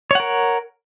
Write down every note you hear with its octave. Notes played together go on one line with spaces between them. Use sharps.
A#4 C#5 F#5